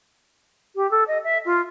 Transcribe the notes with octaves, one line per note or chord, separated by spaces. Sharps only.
G4
A4
D#5
E5
F4